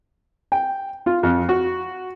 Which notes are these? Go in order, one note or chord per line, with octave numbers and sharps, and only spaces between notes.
G5
F4
F2
F#4